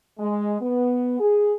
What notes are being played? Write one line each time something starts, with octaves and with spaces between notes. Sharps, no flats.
G#3
B3
G#4